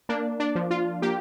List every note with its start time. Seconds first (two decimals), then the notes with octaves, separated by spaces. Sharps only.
0.09 A#3 D4
0.40 D4
0.55 F3
0.70 F4
1.02 A#3 G4